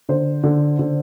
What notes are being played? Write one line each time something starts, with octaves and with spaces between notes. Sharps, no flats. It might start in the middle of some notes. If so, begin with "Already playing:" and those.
D3 C5
D3
D3